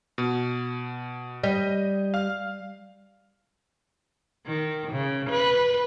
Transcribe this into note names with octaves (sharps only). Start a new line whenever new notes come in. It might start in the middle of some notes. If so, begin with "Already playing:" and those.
B2
G3 D#5
F5 F6
D#3
C#3
B4